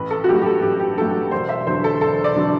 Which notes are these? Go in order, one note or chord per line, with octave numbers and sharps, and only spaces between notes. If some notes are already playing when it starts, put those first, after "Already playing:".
Already playing: A1 B4
A4
F#4
G2 F#3 A3 G4
G4
A4
A1 G4
G4
G2 F#3 A3 A4
E1 C5
E5
E2 D3 F#3 C5
A4
E1 A4
D5
D3 F#3